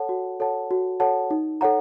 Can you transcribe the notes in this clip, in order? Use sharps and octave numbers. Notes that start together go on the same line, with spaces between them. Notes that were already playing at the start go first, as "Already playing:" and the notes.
Already playing: A4 C#5 F#5 A5
F#4
A4 C#5 F#5 A5
F#4
A4 C#5 F#5 A5
D#4
A4 C#5 F#5 A#5